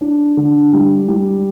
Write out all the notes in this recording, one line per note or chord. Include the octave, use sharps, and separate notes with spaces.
D4
D3
G3
G3